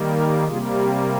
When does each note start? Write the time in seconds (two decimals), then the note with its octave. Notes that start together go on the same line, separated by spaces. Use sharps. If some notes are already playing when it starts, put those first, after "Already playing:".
Already playing: D#3 G3 A#3
0.14 G4 A#4
0.46 C3 G3 A#3 F4 G#4
0.81 G4